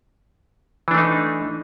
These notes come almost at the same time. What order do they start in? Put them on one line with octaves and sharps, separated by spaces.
E3 D4 A3 D#4